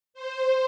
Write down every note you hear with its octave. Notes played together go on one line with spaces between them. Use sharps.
C5